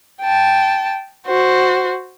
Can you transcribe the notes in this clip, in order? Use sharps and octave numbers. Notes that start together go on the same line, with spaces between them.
G5 A5
F#4 C5